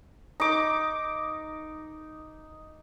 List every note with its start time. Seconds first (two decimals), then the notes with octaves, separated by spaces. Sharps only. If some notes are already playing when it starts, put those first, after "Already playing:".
0.40 D#4 D6